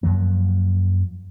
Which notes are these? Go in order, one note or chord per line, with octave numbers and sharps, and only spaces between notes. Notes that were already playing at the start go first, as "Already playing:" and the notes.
F#2 F3 F#3 A#3